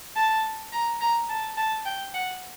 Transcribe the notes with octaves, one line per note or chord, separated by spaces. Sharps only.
A5
A#5
A#5
A5
A5
G5
F#5